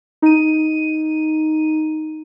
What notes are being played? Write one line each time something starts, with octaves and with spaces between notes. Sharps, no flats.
D#4 D#7